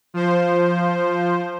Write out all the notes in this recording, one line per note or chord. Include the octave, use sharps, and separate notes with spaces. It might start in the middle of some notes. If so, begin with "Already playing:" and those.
F3 C5